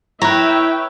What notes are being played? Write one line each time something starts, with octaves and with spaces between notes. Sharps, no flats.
E4 B4 C#5 E5 G5 A#5